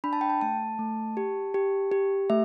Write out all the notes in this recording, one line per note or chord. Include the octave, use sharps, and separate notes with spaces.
D4 B5
A5
G5
A5
A3 A5
A3
G4
G4
G4
A3 E5